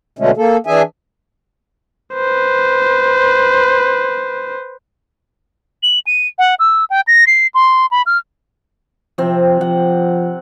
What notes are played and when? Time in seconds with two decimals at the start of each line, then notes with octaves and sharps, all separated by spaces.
0.19 B2 D3 G#3 A3 C#4
0.37 A#3 A4
0.67 E3 D4 G#4 E5 G#5
2.14 B4 C5
5.83 F#7
6.07 D#7
6.39 F#5
6.59 E6
6.90 G5
7.07 A#6
7.27 C7
7.54 C6
7.91 B5
8.06 F6
9.18 C3 F3 C4
9.61 F3 F#5